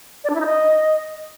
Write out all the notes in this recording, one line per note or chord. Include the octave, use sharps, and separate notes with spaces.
D5
D4
E4
D#4
D#5